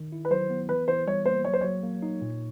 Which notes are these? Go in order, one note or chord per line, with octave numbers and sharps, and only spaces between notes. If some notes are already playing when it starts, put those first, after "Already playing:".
Already playing: D#3
E4
B4
F#3 C5
B3
E3 B4
E3 C5
G3 C#5
A#3 C5
F#3 C#5
C5
F#3 C#5
A#3
D#4
A#2